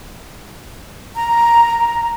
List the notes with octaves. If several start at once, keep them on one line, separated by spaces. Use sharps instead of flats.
A#5